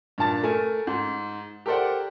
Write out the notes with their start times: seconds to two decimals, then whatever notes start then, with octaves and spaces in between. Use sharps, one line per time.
0.18 G2 A#2 A5 A6
0.43 A3 A#4 G#5
0.87 G#2
1.66 G4 A4 A#4 C5 D5 F#5